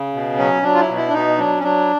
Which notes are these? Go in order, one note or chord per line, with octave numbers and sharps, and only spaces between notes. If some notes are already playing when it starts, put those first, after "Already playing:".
Already playing: C#3
B2
F#3 C#4
F#3 D4
F4
E4
B2
E4
D4
B2 D#4
F#3 D4
C#4
F#3 D4